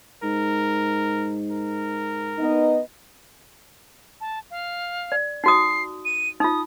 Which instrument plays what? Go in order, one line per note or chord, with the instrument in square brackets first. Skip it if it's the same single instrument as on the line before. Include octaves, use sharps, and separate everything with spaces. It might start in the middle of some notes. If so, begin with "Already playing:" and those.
[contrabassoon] G#2 [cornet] A#4
[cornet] A#4
[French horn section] B3 D#4 D#5
[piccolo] A5
F5
[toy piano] D5
[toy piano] D#4 F#4 D#6 [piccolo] C7
[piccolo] D#7
[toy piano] D#4 F4 [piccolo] D#6